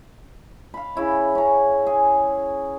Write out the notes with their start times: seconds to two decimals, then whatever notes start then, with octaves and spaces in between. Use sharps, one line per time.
0.74 F5 B5
0.96 C#3 E4 C#5
1.35 C#4 A#5
1.87 G#4